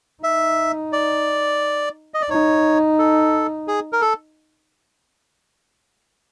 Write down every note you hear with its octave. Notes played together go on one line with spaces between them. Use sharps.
D#4 E5
D5
D#5
D5
D#4 C#5
A4
G#4
A#4
A4